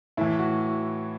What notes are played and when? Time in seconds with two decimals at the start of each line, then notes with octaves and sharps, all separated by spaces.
0.17 A2 E3 E4
0.39 F#4